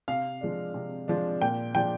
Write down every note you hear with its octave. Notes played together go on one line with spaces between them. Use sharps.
C3 F5
F3 G#3 D4
C3
F3 G#3 D4
A#2 G5
F3 G#3 D4 G5